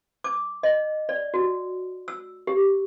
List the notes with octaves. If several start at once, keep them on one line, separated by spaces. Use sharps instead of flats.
D6
D#5
D5
F#4
E6
G4